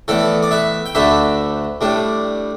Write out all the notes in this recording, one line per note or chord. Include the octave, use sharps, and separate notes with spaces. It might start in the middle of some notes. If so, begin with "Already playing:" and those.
A2 E3 B3 A4 D5
D5
B4 E5
G5
D2 D3 A3 D4 B4 E5
A2 G3 D4